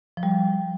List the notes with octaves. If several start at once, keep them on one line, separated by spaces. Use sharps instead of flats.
F3
G3